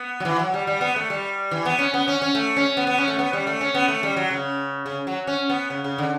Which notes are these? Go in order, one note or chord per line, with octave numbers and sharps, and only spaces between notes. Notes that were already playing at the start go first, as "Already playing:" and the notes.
Already playing: B3
F#3
E3
F#3
G3
G3
B3
A3
G3
E3
B3
C#4
B3
C#4
C#4
A3
C#4
B3
B3
C#4
A3
B3
G3
A3
C#4
B3
A3
G3
F#3
C#3
C#3
F#3
C#4
B3
C#3
C#3
D3